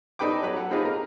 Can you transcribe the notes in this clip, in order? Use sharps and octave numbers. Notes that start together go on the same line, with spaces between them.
D4 D#4 A4 B4 G5 D6
F#3 B4 B5
A4 F#5
A#3 C4 D#4 F4 G#4 B4
A#4